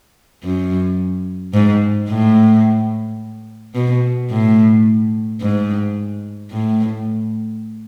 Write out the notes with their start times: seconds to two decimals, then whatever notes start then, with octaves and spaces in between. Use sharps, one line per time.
0.43 F#2
1.54 G#2
2.08 A2
3.75 B2
4.30 A2
5.41 G#2
6.51 A2